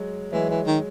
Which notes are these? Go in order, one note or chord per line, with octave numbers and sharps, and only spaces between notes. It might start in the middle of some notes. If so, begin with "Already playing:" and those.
Already playing: F#3 G#3
E3 F#3 G#3
E3
D#3